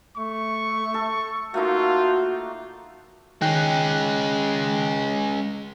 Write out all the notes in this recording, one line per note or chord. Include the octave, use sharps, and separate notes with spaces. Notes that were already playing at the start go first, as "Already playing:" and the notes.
A3 C#6
A4
A3 A#3 D#4 F4 F#4
D#3 G#3 C#4 G5 F#6